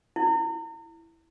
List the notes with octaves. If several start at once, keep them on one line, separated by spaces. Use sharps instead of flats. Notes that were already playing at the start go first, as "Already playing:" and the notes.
E4